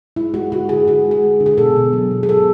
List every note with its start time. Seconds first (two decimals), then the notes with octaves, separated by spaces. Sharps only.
0.16 G#3 E4
0.34 G#3 F#4
0.52 D3 F#4
0.69 D3 G#4
0.87 D3 F#4
1.05 G#3
1.11 G#4
1.23 G#3
1.40 D3
1.46 G#4
1.58 B2 A4
1.76 B2
1.93 F#3
2.11 B2
2.23 G#4
2.28 F#3 A4